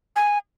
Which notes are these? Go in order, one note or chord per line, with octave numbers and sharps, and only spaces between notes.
G#5